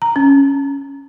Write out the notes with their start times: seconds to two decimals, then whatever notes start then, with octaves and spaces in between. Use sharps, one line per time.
0.02 A#5
0.16 C#4